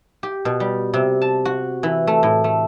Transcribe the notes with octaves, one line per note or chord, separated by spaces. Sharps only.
G4
B2
G3
C3
A5
F#4
E3
A3
A2
A3